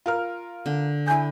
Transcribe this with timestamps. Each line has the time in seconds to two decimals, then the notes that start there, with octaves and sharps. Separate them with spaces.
0.06 F4 A#4 F6
0.66 D3
1.08 E4 G#5 G6